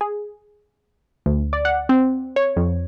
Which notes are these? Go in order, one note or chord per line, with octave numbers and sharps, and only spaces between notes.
G#4
D2
D5
F#5
C4
C#5
F2